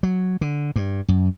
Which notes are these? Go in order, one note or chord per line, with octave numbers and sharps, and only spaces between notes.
F#3
D3
G2
F#2